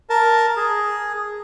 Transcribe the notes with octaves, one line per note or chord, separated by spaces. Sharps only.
A#4 A5
G#4